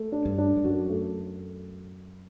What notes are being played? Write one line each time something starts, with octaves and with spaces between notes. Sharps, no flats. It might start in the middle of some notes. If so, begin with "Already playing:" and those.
Already playing: A3
D4
G2
D4
G2
F#2 F#4
A3